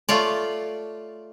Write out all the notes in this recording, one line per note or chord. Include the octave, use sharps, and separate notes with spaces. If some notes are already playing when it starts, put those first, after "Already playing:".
A3 F4 C#5 D5